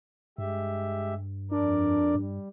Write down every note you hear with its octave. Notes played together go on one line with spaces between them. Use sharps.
G2 G#3 G4 E5
F2 D4 A#4 D5
G2 G3